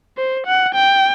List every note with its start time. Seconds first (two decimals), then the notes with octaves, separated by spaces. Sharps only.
0.17 C5
0.47 F#5
0.75 G5